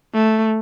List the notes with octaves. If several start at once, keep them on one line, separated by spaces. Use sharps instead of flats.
A3